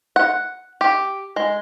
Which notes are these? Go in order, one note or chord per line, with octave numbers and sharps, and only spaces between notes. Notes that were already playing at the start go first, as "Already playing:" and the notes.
F#5
G4
G#3